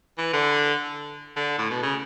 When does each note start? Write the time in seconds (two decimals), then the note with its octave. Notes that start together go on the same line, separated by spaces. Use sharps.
0.18 E3
0.33 D3
1.36 D3
1.58 A2
1.70 B2
1.83 C#3